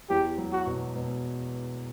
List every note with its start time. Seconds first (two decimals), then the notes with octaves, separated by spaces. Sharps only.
0.10 E2 G4
0.38 F#3
0.53 F#4
0.66 B2
0.95 B2